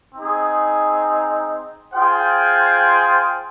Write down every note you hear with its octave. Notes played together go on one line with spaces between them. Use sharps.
C4 D#4 G#4
F4 G#4 C5 G5